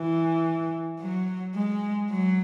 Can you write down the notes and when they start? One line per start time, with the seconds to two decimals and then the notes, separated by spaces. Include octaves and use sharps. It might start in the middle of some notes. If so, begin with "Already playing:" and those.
Already playing: E3
1.00 F#3
1.55 G#3
2.10 F#3